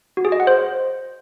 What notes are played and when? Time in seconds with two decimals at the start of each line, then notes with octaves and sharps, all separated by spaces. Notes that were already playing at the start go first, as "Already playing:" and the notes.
0.17 F#4
0.25 G#4
0.32 D#5
0.40 F#5
0.47 C5